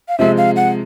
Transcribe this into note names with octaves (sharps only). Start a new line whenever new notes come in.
F5
C3 F3 G#3 E5
F5
F#5